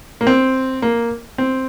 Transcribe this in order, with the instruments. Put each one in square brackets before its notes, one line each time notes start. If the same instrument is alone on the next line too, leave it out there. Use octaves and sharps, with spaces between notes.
[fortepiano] A#3
C4
A#3
C4